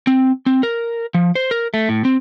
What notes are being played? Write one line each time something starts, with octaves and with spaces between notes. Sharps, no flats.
C4
C4
A#4
F3
C5
A#4
A3
A2
C4